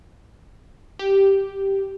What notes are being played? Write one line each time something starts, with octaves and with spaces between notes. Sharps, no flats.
G4